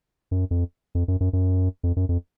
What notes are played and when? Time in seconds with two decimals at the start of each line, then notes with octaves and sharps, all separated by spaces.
0.31 F#2
0.51 F2
0.95 F2
1.08 F#2
1.20 F#2
1.33 F#2
1.83 F2
1.96 F#2
2.09 F2